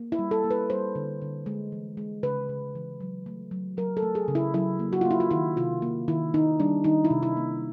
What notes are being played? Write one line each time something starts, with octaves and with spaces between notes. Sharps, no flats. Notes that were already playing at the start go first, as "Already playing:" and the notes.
Already playing: A#3
E4
G3
A4
A#3
B4
G3 C5
D3
D3
G#3
E3
G#3
C#3 B4
C#3
E3
F#3
A3
F#3
F#3 A#4
A4
A3
G#4
C#3
E4
F#3 E4
A#3
F#4
A#3 F4
E4
F4
D#3 E4
C3 F4
A#3
D#3 E4
D#3 D#4
G3 D4
D#3 D#4
E4
C3
E4
A#3